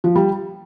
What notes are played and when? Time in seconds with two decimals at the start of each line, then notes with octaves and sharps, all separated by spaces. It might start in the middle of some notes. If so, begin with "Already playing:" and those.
0.04 F3
0.15 G3